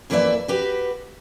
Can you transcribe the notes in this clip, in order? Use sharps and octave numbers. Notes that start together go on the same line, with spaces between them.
F2 E3 A#3 B4 D5 E5
F#4 G4 B4